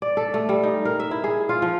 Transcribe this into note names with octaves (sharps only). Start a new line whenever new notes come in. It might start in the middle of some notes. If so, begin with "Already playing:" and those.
D5
A4
A3
G3
D#4
A#4
E5
E4
G#4
F4
F3